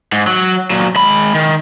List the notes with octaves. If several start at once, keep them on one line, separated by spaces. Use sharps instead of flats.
G#2
F#3
A#2 F#3
G#3 B5
D#3